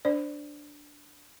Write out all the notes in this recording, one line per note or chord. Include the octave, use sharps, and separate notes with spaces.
D4 C5 D5